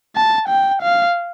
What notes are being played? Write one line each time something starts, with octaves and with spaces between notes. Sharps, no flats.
A5
G5
F5